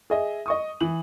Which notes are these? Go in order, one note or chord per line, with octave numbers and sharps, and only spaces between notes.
G#4 D#5 E5
D#5 C#6 D#6
E3 F#7